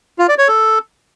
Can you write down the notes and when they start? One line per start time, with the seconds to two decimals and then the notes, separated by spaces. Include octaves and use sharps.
0.19 F4
0.28 D5
0.38 C#5
0.48 A4